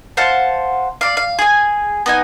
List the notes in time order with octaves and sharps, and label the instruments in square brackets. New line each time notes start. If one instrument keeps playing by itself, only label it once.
[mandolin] C5 F5 F#5 A5
D5 F5
F5
G#4 G#5
B3 D#4 G#5